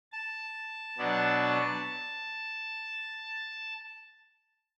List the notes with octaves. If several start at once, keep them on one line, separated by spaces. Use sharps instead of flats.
A5
B2 F#3 B3 D4